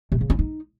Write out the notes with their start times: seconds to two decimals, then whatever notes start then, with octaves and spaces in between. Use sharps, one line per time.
0.12 C3
0.21 C#3
0.30 C#4
0.39 D#4